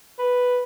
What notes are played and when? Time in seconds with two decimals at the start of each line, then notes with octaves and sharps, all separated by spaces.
0.19 B4